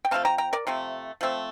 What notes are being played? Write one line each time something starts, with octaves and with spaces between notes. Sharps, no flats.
G5
F3 A3 C4 F5 A5
G5 A#5
G5 A#5
A#4 D5
C3 F3 A3 C4
F3 A3 C4